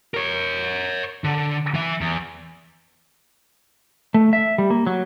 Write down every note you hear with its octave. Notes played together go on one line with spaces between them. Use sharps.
A#4 C#5
D3
E3 E5
E2
A3
E5
G3
A#3
F#3